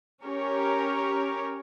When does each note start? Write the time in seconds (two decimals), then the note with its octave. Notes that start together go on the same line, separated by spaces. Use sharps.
0.23 C#4 G4 A#4 C#5